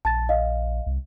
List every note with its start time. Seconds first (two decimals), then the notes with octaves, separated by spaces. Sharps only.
0.05 A#1 A5 A6
0.29 D#5 F5
0.87 C2